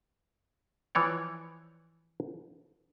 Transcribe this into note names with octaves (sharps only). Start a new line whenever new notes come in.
E3 F3 C#5 D5